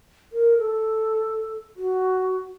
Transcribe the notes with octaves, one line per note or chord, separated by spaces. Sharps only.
A#4
A4
F#4